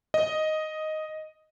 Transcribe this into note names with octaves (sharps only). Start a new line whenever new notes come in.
D#5